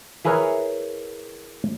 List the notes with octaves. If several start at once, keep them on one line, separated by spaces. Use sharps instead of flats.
E4 G#4 A#4 B4 C#5